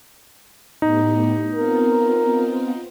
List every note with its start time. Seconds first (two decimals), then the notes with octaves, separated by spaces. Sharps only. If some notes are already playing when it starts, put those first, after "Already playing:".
0.82 A2 B3 D#4 G4
1.55 B3 C4 F4 A#4